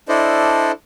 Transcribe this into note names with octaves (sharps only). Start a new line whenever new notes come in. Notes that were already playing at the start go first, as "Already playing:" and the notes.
D4 E4 A4 C5 D5 D#5